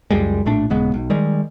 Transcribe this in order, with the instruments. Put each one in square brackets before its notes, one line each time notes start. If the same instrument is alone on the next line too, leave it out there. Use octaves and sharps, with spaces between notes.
[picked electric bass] C#2 F#2 G3 G#3
A#1 A2 A3 D4
D#1 C#3 G#3 B3
B1
D#3 G3 G#3